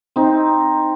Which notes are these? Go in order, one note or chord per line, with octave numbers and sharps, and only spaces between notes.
C4 D#4